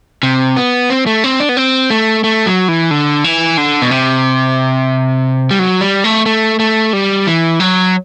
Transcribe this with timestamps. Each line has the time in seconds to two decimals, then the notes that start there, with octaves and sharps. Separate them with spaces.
0.23 C3
0.56 B3
0.90 C4
1.07 A3
1.24 C4
1.40 D4
1.49 B3
1.57 C4
1.90 A3
2.24 A3
2.46 F#3
2.68 E3
2.91 D3
3.24 E3
3.58 D3
3.82 B2
3.91 C3
5.51 G3
5.59 F#3
5.81 G3
6.04 A3
6.26 A3
6.59 A3
6.93 G3
7.27 E3
7.60 F#3